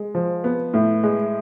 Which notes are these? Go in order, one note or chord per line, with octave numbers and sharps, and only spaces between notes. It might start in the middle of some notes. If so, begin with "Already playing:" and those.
Already playing: G#3
F3
B3
A2
G#3